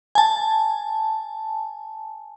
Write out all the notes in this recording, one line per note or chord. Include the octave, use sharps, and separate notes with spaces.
G#5 A5